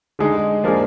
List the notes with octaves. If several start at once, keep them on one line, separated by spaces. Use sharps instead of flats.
D3 G#3 D#4 G#4
F3 A#3 D4 G#4